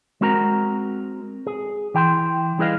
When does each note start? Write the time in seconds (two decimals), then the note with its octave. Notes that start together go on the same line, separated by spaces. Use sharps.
0.21 G#3 C4 F#4 A#4 A#5
1.47 G#4
1.94 E3 G5 B5 C6
2.58 G3 E4 G#4 B4 D#5 F5